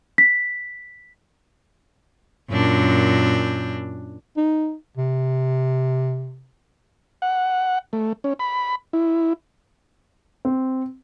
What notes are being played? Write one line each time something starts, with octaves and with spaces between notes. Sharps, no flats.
B6
F#2 A#2 D4
D#4
C3
F#5
A3
C#4
B5
E4
C4